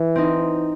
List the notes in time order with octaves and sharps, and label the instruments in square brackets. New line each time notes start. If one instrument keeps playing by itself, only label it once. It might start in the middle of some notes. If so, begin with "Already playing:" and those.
Already playing: [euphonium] E3
[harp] C4 D#4